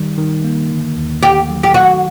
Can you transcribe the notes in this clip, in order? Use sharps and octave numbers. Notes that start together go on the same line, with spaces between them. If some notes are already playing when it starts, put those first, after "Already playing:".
Already playing: D#3 G3
D#3
A#3
D3
D#2
D#2 G4
F#3
G4
D#3 F#4